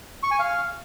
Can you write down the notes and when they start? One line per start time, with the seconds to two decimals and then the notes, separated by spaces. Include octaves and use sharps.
0.23 C#6
0.31 G#5
0.39 F5